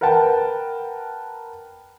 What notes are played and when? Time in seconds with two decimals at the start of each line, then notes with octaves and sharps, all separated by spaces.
0.01 A#4 B4 F#5 G5 A5